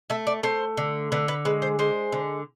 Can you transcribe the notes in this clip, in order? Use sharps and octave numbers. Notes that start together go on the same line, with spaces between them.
A3 E5
D5
A3 C5
D3
D3 B4
B4
G#3 B4
C5
G#3 C5
D3